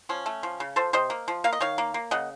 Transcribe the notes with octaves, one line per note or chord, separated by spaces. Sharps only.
F3 C#4
A3
F3
C#3
F3 A4 C5
C3 C5 D#5
A#3
F3
A#3 F5
D#5
D#3 C#5 F5
A#3
A#3
C#3 D#5 F#5